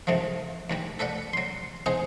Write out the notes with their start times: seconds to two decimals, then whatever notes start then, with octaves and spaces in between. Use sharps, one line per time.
0.07 C#2 F#2 C3 D#3 F3
0.70 D#2 B2 G3
0.99 A4 B4 D5 F#5
1.33 F#3 C6
1.86 B3 D#4 G#4 C5